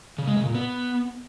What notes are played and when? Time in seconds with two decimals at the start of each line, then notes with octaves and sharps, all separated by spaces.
0.18 C#3
0.27 G#3
0.37 C#3
0.46 A#2
0.55 B3